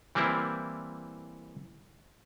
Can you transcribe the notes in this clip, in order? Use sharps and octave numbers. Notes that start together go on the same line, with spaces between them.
E3 G3 A#3 C4 E4